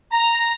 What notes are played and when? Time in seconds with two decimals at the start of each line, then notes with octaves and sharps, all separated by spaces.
0.13 A#5